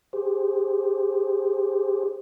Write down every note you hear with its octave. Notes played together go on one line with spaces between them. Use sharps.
G4 G#4 C5